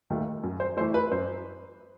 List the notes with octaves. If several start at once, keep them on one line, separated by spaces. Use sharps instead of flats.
D#2 D#3 A3
F#2
C5
E3 A3 C5
B4
F#2 C5